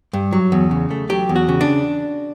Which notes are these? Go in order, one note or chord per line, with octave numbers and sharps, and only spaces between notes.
G2
F#3
E2
C#3
A3
F#3 G4
E2
F#4
C#3
D4